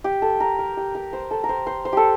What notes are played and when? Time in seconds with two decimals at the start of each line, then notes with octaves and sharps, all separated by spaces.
0.04 G4
0.22 A4
0.40 A#4
0.59 A#4
0.77 G4
0.95 A#4
1.13 C5
1.31 A4
1.44 A#4
1.49 C5
1.67 C5
1.85 C5
1.93 G4 A4